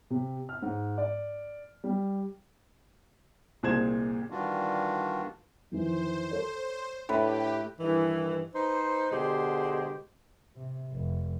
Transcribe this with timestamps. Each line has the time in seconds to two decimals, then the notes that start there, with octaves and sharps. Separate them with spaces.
0.10 C3
0.49 F6
0.62 G#2
0.98 D5
1.84 G3
3.63 C2 A#2 G#3 C5 G#6 E7
4.30 D#3 E3 G3 D4 F4 F#4
5.71 F2 D#3 E3 C5
6.31 A4 C#5
7.09 A2 D4 G4 B4 B5
7.78 G2 D#3 E3
8.54 D#4 B4 C5
9.11 B2 D3 G#3 G4 C5
10.56 C3
10.93 F1